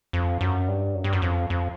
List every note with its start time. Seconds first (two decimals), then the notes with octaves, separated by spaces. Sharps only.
0.13 F2
0.41 F#2
0.68 G2
0.95 F#2
1.04 G2
1.13 F#2
1.22 F2
1.50 F2